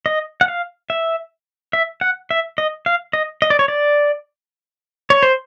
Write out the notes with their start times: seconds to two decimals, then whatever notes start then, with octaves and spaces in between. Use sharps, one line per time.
0.06 D#5
0.41 F#5
0.48 F5
0.90 E5
1.73 E5
2.01 F#5
2.31 E5
2.58 D#5
2.86 F5
3.13 D#5
3.42 D#5
3.50 D5
3.59 C#5
3.68 D5
5.10 C#5
5.23 C5